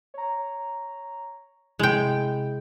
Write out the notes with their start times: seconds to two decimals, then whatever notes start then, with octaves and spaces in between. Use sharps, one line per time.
0.14 C#5 A#5
1.79 C3 G#3 E4 G5